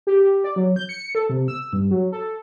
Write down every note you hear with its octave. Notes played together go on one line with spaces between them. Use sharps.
G4
G4
D5
F#3
G6
C#7
A4
C3
E6
G2
F#3
A4